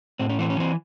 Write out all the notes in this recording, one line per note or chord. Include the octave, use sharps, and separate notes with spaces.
A2 C4
C#4
E3 C4
C#4
E3 C4